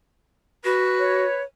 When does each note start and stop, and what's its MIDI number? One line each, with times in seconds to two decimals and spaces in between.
0.64 1.25 66
0.64 1.39 71
0.98 1.43 73